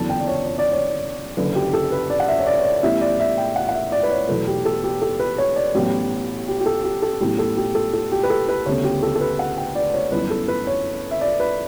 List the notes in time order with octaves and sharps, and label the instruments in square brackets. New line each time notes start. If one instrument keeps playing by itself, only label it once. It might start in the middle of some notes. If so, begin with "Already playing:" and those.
Already playing: [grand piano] F#1 E2 D3 F#3 B3 A5
G5
D5
C#5
C#5
D5
C#5
F#1 F#2 D3 B4
G4
A4
B4
D5
F#5
E5
C#5
D5
C#5
D5
A1 A2 G3 B3 E5
D5
E5
G5
F#5
F#5
E5
D5
B4
C#5
E2 B2 F#3 A3 B4
G4
A4
G4
A4
B4
C#5
D5
A1 A2 F#3 B3 G4
G4
G4
A4
G4
A4
A1 A2 F#3 B3 G4
A4
G4
A4
A4
G4
B4
A4
B4
D2 C#3 G3 B3 C#5
G4
A4
A4
B4
F#5
G5
D5
C#5
G1 F#2 E3 B3 B4
A4
B4
C#5
E5
D5
B4